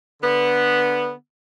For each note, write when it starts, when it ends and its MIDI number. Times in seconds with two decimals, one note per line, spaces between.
0.23 1.12 50
0.23 1.12 59